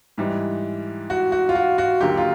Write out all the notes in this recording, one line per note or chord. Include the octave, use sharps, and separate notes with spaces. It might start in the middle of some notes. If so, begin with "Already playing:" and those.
G#2 E3 G3
F#4
F#4
F4
F#4
F#4
D#2 D3 F#3 A#3 G4
F4